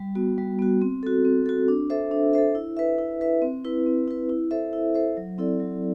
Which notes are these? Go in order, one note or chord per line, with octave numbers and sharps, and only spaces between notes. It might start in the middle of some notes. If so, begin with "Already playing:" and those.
Already playing: G3
B3 F#4
G3
B3 F#4
C4
F#4 A4
C4
F#4 A4
D4
A4 C5 E5
D4
A4 C5 E5
E4
B4 E5
E4
B4 E5
C4
E4 B4
C4
E4 B4
E4
A4 C5 E5
E4
A4 C5 E5
F#3
C4 E4 A4 D5
F#3